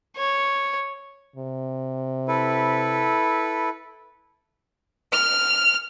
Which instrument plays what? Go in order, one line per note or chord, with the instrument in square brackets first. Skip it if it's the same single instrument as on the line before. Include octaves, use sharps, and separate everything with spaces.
[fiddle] C#5
[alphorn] C3
[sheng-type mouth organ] E4 A4 B4
[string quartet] F6